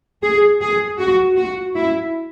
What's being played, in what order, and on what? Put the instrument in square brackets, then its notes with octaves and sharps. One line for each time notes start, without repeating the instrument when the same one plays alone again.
[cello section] G#4
G#4
F#4
F#4
E4